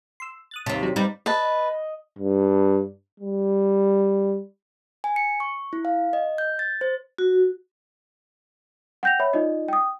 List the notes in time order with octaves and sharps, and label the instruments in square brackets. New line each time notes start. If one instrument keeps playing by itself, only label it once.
[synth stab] C6 E6
D#6 F#6 A6
[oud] D#2 C3 [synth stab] A5
[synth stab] F#3 D4
[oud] G3 [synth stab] C4 D#4 B4
[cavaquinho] B4 A5 [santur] D#5
[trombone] G2
G3
[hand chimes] G#5
C#7
C#6
E4
F5
D#5
G6
A6
C5
[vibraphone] F#4
[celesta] F#5 G5 G6 A#6 F7
C#5 E5 B5
D#4 F4 D5 D#5
G5 D#6